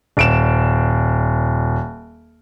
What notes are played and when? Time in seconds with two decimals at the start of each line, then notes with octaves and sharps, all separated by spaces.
0.17 D#1 D7 E7